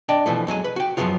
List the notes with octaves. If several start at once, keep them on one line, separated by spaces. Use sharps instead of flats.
D4 D5 D#5 G5
B2 E3 F3 A3
F2 F#3 G#3 G#5
B4
F#4 G5
F#2 C#3 F3 F#3 B3 F4